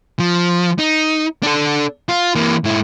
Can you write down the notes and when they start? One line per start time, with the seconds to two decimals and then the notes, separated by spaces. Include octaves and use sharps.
0.19 F3
0.79 D#4
1.43 D4 A4
2.09 F4
2.35 E3 A#3
2.64 G#2 E4